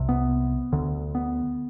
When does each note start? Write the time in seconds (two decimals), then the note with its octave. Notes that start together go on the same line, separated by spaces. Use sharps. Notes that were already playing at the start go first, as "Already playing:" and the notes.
Already playing: C2 C3
0.09 B3
0.73 D2 D3
1.15 B3